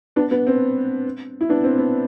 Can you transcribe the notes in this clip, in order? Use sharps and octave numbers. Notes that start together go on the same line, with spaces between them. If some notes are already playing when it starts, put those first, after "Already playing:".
B3 D4
B3
C4
E4
B3 D4
C4
B3